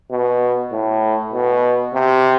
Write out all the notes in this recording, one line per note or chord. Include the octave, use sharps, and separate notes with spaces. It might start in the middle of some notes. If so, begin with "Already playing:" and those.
B2
A2
B2
C3